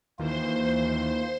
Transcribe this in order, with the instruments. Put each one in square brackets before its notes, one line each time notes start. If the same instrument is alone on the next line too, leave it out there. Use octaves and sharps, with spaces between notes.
[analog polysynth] D#2 D#3 E3 [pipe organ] A#3 F4 [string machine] C5 C6